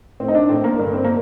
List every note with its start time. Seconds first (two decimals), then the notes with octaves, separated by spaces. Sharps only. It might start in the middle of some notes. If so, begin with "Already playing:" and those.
0.20 A2 C4
0.28 D#4
0.35 D4
0.49 A2 C4
0.64 A#3
0.79 G2 D3
0.94 C4
1.04 A#3